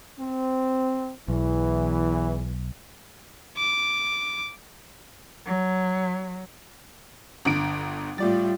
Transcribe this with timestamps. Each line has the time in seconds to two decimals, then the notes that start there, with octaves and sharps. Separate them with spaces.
0.19 C4
1.28 B1 E2 E3
3.57 D6
5.47 F#3
7.45 G1 D3 D7
8.18 A2 G3 F4 D5 A6